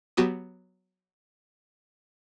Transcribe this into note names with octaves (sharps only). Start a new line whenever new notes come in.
F#3 B3 F#4 G4 D#6